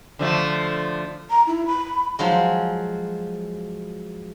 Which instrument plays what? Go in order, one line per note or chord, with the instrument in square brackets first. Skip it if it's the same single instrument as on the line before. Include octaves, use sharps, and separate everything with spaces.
[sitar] D3 F3 A3
[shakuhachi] A#5
E4
B5
[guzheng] F3 F#3 G#3